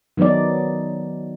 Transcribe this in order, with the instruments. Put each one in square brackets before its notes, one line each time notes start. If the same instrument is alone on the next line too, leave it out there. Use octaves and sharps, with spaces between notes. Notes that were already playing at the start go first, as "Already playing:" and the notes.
[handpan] D#3 F#3 B3 D#4 D5